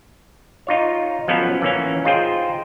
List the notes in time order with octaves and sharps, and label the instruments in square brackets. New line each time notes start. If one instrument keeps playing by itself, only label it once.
[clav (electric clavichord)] D#4 F4 C#5
F3 F#3 B3 C#4 A4 B4
E3 A#3 C#4
D#4 F4 G#4 C5 G5